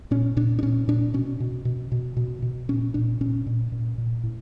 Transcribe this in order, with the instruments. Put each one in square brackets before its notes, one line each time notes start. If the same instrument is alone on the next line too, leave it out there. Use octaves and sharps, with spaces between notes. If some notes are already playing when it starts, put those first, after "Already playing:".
[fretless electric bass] A#2 C#4
A#2 D4
D4
A#2 C#4
A#2 D4
B2 C#4
B2
B2
B2
B2
B2
A#2 C#4
A#2 D4
A#2 C#4
A#2
A#2
A#2
A2